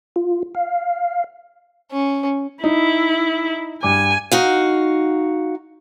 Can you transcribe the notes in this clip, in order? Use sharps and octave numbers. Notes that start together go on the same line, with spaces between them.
F4
F5
C#4
D#4 E4
G2 G#5 D6
D#4 F#4 F5